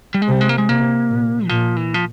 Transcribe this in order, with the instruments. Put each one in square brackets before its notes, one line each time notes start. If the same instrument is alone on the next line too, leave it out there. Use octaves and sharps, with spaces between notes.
[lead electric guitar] G3
G#3
[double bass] C3 [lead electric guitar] G3
[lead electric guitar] G#3
A#3
G#3
[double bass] C3 [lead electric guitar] A#3
[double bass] A#2
[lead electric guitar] E3
[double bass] A#2 [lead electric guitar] F3
[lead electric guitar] E3
F3